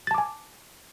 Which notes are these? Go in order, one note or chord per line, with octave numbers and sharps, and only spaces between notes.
G#5 A5 D6 A6